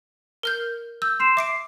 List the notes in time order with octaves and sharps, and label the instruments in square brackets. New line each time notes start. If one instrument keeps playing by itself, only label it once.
[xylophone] A#4 F6 G6
[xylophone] E6 [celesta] G6
[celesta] C6 C7 E7
[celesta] E5 [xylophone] D6 C7 D7